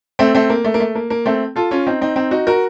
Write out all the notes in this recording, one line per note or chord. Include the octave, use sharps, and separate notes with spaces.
A3 C4
A3 C4
A#3
A3
A#3
A3
A#3
A#3
A3 C4
F4 A4
C#4 F4
C4 D#4
C4 D#4
C4 D#4
D#4 F#4
F#4 A#4